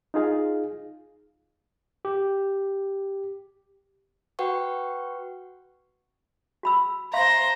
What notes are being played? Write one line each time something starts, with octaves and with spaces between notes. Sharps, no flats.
D#4 F4 G#4 F5
G4
F#4 B4 F#5 G5 C#6
F#4 B5 E6
C5 E5 F5 A#5 C6